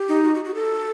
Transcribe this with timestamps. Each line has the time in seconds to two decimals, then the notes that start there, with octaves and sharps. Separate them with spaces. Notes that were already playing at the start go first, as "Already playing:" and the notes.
Already playing: G4
0.08 D#4
0.24 F#4
0.34 F#4
0.45 F#4
0.55 A4